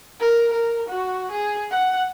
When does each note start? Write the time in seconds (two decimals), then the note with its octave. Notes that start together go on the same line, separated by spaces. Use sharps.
0.20 A#4
0.53 A#4
0.88 F#4
1.31 G#4
1.71 F#5